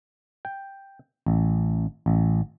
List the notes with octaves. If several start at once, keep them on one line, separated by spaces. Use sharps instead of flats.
G5
A1
A1